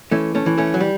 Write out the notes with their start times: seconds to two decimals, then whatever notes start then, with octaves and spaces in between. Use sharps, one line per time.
0.11 E3 A3 C#4
0.35 A3 C#4
0.46 E3
0.58 A3 C#4
0.74 F#3
0.80 G3